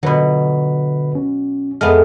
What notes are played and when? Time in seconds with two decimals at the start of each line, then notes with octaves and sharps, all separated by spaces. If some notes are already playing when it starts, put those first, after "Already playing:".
0.03 B2 D3 F#3 B4 B5
1.15 C#4
1.81 F2 G#3 A3 B3 F6